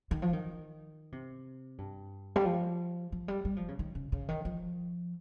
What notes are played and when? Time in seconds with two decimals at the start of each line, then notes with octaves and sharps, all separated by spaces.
0.11 D#3
0.22 F3
0.33 D#3
1.12 C3
1.78 G2
2.36 G3
2.45 F3
3.12 F3
3.28 G3
3.45 G3
3.57 F3
3.68 C#3
3.79 D#3
3.95 C#3
4.12 C#3
4.29 D#3
4.45 F3